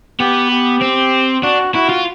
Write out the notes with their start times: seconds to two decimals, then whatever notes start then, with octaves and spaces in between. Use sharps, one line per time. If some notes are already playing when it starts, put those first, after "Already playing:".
0.20 B3 G4
0.51 G4
0.82 C4
1.43 D4 F#4
1.74 E4 F#4
1.89 F4